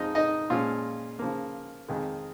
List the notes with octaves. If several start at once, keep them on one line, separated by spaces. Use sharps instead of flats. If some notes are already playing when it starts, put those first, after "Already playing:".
Already playing: F2 F3 G#3 D#4 D#5
D#4 D#5
A#2 F3 G#3 C#4 F4
C#3 F3 A#3
F2 D#3 G#3